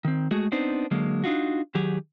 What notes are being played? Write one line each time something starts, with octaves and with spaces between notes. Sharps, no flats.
D#3 C4
G#3 A3 F#4 G#4
B3 C4 D4 D#4 C5
D3 F#3 G#3 A#3
D4 D#4 F4 F#4
D#3 F#3 G4 G#4